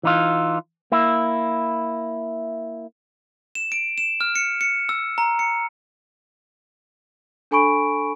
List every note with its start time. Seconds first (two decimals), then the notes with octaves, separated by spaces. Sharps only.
0.03 E3 D#4 F4
0.92 A#3 E4
3.55 E7
3.72 D7
3.98 E7
4.21 F6
4.36 C#7
4.61 C#7
4.89 E6
5.18 A#5
5.39 C#7
7.51 D4 A4 G#5 B5 C#6 D7